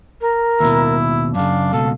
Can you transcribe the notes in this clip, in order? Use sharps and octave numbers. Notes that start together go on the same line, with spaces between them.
A#4
D#2 B2 E4
F#2 C#3 D4 F5
C#2 B2 A4